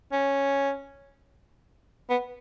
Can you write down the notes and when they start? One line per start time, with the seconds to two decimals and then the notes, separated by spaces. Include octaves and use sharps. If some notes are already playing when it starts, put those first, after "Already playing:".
0.12 C#4
2.10 B3